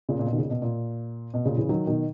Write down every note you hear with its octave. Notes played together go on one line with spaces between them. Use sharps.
A#2 C#3
A#2
B2
D#3
A#2 C#3
B2
A#2
B2
A#2 C#3
C#3 E3
D#3 F#3
B2 D#3